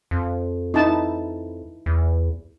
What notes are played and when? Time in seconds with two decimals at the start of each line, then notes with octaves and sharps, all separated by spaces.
0.11 F2
0.74 D#4 E4 A5
1.86 E2